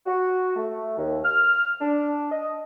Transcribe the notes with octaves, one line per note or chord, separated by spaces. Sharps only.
F#4
A3
D#2
F6
D4
D#5